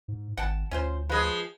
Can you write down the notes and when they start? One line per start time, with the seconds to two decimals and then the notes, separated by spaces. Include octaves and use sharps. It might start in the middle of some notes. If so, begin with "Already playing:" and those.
0.08 G#2
0.37 G#1 F#5 G5 A5
0.71 D2 C#4 F4 C5
1.09 F3 G#3 G#4 B4